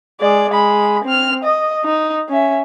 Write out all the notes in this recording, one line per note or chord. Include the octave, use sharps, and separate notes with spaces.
G#3 D5
G#3 B5
C4 F6
D#5
D#4
C#4 E5